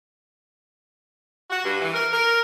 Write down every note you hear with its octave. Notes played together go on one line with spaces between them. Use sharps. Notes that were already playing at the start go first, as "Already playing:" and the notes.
F#4
G2
E3
A#4
A#4